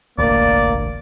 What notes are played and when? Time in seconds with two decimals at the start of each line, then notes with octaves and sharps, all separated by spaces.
0.18 E1 A1 D2 A#3 D5